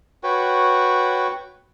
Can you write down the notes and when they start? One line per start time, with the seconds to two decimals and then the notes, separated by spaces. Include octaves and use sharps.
0.23 F#4 B4 C#5 G5